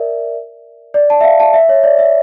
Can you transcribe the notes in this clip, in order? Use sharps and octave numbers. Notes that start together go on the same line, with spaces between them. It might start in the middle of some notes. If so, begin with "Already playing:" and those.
Already playing: A#4 D5 E5
D5
A5
E5
F5
A5
E5
C#5
D5
E5